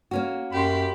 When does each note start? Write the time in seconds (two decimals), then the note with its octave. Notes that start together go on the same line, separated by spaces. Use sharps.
0.11 A#3 C#4 F#4
0.52 F#2 G4 B5 C6